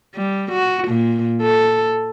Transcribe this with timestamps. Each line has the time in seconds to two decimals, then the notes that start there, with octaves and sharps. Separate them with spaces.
0.15 G3
0.52 F#4
0.88 A#2
1.42 A4